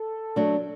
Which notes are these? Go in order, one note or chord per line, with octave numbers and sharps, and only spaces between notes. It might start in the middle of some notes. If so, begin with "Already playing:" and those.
Already playing: A4
F#3 A3 D4